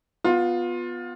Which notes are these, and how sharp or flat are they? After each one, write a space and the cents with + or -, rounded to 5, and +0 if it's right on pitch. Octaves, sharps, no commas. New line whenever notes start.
B3 +0 F4 +20